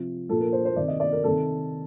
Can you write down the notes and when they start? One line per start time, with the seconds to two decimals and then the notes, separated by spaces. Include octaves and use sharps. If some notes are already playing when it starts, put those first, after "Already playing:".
Already playing: C3 F3
0.29 A#2 F3 A4
0.40 A#4
0.53 C5
0.65 C5
0.76 C3 D#3 D5
0.88 D#5
1.00 D5
1.12 A#4
1.24 C3 D#3 A4